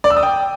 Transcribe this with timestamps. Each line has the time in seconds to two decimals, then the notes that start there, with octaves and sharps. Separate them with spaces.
0.04 D5
0.10 E6
0.17 D#6
0.23 G5